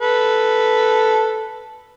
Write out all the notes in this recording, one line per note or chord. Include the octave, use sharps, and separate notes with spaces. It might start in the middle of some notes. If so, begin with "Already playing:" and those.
A4 B4